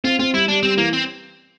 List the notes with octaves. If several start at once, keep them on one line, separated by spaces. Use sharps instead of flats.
C4 F4
C4 F4
G3 E4
G3 D4
G3 C4
E3 A#3
C4